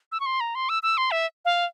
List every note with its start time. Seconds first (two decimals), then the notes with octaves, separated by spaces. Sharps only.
0.12 E6
0.20 C#6
0.26 C6
0.40 A#5
0.55 C6
0.69 E6
0.83 E6
0.97 C6
1.11 E5
1.45 F5